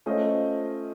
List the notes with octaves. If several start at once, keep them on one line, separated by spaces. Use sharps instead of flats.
A3 C#4 F4 C5 D#5